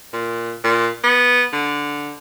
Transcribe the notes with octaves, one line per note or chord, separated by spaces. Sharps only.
A#2
A#2
B3
D3